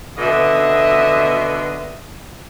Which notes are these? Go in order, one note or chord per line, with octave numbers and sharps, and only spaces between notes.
B2 D3 D#5 E5